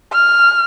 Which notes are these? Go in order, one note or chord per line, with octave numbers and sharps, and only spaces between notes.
F6